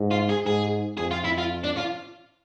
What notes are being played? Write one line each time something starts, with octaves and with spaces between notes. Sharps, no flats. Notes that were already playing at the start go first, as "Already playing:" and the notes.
Already playing: G#2
F4
G#4
G#2 G#4
F2 G#4
F4
E4
F4
D4
F4